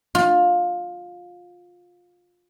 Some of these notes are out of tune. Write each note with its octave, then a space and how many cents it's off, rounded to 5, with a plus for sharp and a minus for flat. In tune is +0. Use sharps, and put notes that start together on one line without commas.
F4 +20